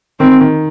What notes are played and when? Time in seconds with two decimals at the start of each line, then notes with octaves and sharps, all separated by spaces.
0.20 D#3 C4
0.41 D#3